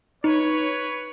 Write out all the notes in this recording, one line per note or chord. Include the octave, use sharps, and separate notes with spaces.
D#4 B4 C#5